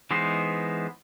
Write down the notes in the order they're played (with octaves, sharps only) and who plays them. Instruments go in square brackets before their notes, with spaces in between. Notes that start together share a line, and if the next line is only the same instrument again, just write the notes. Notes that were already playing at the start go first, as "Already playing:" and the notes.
[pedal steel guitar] E3 G#3 B3 D#4 C5